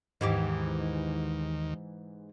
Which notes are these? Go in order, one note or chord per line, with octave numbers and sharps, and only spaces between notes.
D#2 G#2 D#3 E3 G4